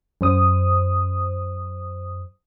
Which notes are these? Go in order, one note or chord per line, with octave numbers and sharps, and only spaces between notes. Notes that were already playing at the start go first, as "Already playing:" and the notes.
F#2 C5 D#6